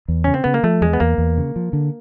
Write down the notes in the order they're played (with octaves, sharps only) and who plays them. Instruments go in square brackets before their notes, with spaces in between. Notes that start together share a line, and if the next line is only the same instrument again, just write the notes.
[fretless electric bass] E2
[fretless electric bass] C#3 [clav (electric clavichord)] C#4
[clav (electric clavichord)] C4
[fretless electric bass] C#3 [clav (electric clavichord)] B3
[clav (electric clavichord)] A#3
[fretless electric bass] F3 [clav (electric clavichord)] A3
[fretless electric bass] E2 [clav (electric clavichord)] G#3
[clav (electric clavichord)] B3
[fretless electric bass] E2 [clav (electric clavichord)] A#3
[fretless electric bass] E2
C#3
F3
D3